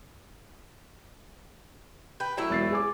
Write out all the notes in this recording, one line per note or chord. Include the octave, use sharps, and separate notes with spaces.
B4 G5
F#3 A3 E4
E1 A6 C7
G#4 G#5 D6